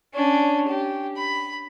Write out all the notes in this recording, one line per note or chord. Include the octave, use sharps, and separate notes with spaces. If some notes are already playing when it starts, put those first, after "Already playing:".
C#4 D4
G4
B5